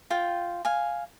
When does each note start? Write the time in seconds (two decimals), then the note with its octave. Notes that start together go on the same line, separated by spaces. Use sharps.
0.10 F4 G5
0.65 F5 G#5